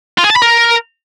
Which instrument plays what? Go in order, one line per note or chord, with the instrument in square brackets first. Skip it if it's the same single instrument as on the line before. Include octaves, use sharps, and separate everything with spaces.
[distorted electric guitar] F4
G#4
A5
B5
A#4